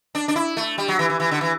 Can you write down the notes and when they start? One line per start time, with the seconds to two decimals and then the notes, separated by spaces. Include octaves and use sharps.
0.15 D4
0.28 D4
0.36 E4
0.57 A3
0.78 G3
0.88 F#3
0.99 E3
1.10 E3
1.20 E3
1.31 D3
1.41 E3